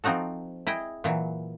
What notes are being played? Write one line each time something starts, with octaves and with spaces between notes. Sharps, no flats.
F3 C4 D#4 F#4 A4
E4 G#4 D#5 G5
A#2 E3 F#3